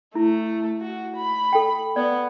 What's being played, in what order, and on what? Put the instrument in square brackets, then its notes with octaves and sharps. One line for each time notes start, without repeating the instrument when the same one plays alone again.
[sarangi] A3 [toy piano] E4
[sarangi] F#4
B5
[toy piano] A4 G5
[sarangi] B3 [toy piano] D5